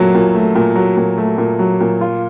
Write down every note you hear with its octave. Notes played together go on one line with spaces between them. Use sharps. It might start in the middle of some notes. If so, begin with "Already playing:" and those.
Already playing: A#2 F#3 A3
A#2
A3
A#2
F#3
A#2
A3
A#2
F#3
A#2
F4